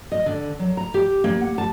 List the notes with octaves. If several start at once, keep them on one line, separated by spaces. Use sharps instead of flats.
D#5
D3
F#3
A#5
G4
A#3
F#5
A5